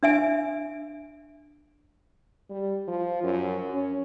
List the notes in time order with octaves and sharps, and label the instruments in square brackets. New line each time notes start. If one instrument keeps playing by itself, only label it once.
[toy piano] D4 E5 G#5
[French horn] G3
F3
F#2
C#4